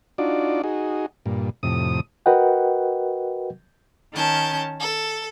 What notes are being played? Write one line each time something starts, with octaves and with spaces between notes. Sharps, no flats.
D4 D#4 F4 F#4 D5
D#4 F#4 G#4
G2 A#2
F2 A2 C3 D#6
F#4 A#4 B4 D#5 F#5 G5
D#3 C#4 A5 G6
A4